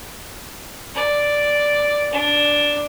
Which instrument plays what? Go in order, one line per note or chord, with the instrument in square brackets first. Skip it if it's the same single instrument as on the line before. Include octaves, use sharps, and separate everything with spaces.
[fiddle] D5
D4